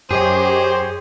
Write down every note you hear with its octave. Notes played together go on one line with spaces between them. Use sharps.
F#2 G4 G#4 C5 C#5 D#5